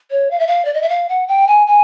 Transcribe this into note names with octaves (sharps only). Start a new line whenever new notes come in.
C#5
F5
E5
F5
D5
D#5
E5
F5
F#5
G5
G#5
G#5